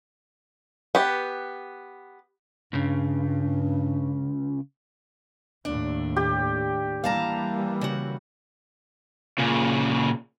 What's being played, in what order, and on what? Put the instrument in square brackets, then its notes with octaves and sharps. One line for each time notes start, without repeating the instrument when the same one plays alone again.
[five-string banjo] B3 G4
[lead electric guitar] C#2 C#3 [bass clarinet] G2
[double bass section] D#2 A2 [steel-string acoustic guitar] D4
[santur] G4
[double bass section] E3 G3 A#3 [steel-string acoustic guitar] F5 A5 A#5
[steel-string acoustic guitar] C#3 F#4
[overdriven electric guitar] A#2 C#3